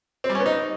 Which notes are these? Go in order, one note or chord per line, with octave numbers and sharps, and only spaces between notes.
C4
G3
C#4
B3
D#4